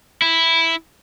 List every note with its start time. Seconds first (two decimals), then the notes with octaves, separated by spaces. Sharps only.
0.22 E4